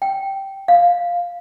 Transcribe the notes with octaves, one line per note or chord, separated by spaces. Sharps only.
G5
F5